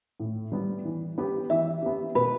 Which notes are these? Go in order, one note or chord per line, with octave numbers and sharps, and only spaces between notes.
A2
G3 B3
E3
B3 G4
E3 E5
B3 G4
B2 B4